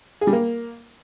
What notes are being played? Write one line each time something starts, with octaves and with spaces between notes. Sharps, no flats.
G#4
G3
A#3